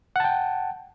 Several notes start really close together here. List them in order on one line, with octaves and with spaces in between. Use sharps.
F#5 A5 G5